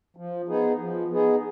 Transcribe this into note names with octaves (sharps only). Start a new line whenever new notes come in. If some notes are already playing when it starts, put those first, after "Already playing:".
F3
B3 D#4 G#4
F3
B3 D#4 G#4